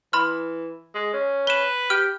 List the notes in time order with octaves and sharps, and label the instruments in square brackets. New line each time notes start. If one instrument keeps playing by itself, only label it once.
[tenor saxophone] E3 [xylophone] B5 C6 F6
[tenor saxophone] G#3
C#4
[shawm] B4 [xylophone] E7 G7
[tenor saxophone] G4 [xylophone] F6